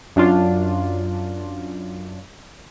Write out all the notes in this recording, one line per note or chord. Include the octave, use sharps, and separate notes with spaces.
F#2 D4 F4